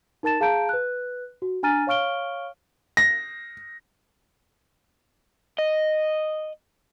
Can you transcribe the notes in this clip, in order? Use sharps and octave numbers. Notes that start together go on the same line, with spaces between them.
D#4 A#4 A5 A6 E7
G#4 F5 A5 A#5 G6 D7
B4 F#6
F#4
D4 G#5 A#5 F6 A6 D#7
C#5 F5 C#6 F6 D7 G7
A#6
D#5